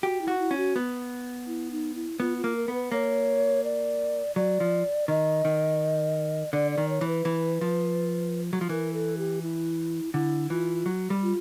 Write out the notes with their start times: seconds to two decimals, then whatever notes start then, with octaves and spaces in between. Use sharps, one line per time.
0.03 F#4 G4
0.22 E4
0.28 F#4
0.39 E4
0.51 C#4
0.57 F#4
0.76 B3
1.47 E4
1.72 D#4
1.95 E4
2.20 B3 F4
2.37 F4
2.44 A#3
2.56 A#4
2.68 B3
2.73 B4
2.92 A#3 C#5
3.64 D5
4.36 F#3 D5
4.60 F3
5.08 D#3 D#5
5.45 D#3
6.53 D3 D5
6.71 D5
6.78 D#3
6.89 C#5
7.01 E3
7.07 B4
7.25 E3
7.61 F3
8.53 F#3
8.61 F3
8.69 E3 A#4
8.93 A4
9.18 G4
9.42 E4
10.14 D3 E4
10.50 E3 F4
10.86 F#3
11.10 G3
11.23 F4